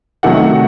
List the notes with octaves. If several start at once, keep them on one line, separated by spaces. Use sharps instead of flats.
C3 D#3 F#3 A3 F#5